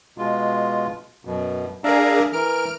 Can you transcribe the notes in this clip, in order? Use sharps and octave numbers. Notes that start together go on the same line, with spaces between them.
B2 G#3 F4
F#2 B2
D4 G#4 A#4 E5 F5 A#5
E3 A#4 F6 D7